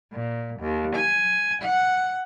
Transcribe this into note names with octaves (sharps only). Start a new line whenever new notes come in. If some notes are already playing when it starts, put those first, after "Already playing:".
A#2
D#2
G#5
F#5